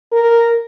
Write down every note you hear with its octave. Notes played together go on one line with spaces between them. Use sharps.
A#4